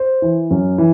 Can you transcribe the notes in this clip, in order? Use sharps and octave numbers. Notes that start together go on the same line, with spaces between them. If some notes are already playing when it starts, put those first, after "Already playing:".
Already playing: C5
E3
F#2
E3